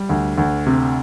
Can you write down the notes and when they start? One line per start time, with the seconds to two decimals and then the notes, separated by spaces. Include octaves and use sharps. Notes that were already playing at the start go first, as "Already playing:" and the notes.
Already playing: G3
0.09 D2
0.38 D2
0.67 C3